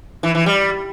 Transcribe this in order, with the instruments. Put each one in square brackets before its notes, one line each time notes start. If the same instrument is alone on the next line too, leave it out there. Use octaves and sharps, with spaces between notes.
[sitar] E3
E3
G3